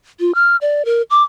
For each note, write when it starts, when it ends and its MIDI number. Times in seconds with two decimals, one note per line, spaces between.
0.20 0.34 65
0.35 0.56 89
0.61 0.85 74
0.85 1.02 70
1.10 1.23 86